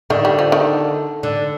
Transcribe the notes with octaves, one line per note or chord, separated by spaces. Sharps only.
D3 D#3
G3
F3
D#3
D3